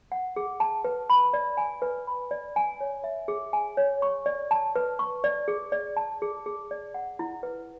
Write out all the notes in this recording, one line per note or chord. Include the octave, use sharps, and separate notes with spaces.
F#5
G#4
A5
B4
B5
D5
G#5
B4
B5
D5
G#5
C#5
E5
G#4
G#5
C#5
C#6
D5
A5
B4
C#6
D5
G#4
D5
A5
G#4
G#4
D5
F#5
E4
B4